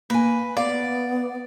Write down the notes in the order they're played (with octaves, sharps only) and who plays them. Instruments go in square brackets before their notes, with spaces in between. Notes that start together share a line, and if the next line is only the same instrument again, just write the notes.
[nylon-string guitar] A#3 G#5 [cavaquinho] B4
[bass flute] B3 [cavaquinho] D5 [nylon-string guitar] F5